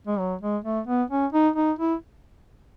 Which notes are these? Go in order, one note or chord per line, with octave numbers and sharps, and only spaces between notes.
G#3
F#3
G#3
A3
B3
C#4
D#4
D#4
E4